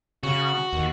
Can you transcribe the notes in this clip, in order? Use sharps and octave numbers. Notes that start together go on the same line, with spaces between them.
C#3 F#4
D#2